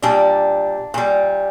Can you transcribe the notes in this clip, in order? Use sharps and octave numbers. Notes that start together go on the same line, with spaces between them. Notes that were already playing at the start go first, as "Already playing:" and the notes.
A#2 G3 D4
A#2 G3